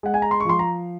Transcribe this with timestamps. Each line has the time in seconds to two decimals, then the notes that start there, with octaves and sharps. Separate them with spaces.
0.03 G#3 F#5
0.14 G#5
0.22 A#5
0.31 C6
0.40 C#6
0.45 F3 C6
0.59 A#5